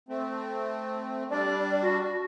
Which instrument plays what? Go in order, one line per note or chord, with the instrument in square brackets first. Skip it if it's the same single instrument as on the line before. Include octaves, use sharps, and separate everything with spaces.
[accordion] A3 C4
[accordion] G3 D4 [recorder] D5
[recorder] F#4